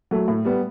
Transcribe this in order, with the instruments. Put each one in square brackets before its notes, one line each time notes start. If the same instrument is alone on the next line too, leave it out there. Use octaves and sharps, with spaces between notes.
[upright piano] F#3 A3
A2
G3 B3